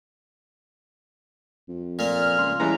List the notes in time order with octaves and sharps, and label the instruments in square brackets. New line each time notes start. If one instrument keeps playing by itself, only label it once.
[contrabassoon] F2
[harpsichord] A#2 A#3 [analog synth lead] F6
[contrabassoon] C#2 [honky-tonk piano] C6
[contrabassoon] E3 [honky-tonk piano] G3 G#3 C#4 [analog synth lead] A#5